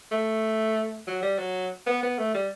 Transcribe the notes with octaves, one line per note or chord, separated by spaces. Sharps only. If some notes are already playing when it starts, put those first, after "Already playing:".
A3
F#3
G3
F#3
B3
B3
A3
G3